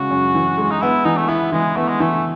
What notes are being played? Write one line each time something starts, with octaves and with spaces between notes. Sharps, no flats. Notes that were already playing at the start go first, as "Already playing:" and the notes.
Already playing: C#3 G#3 F#4
F#2
E3
G#3
D#4
B3 E4
E3 D#4
A3
B3 E4
E3 G#3
A3 B3
G#3
E3 A3